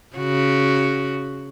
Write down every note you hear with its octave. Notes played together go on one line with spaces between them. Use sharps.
C#3 F#4